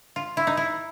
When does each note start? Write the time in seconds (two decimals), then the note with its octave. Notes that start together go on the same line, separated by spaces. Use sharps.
0.16 F4
0.37 E4
0.47 D#4
0.57 E4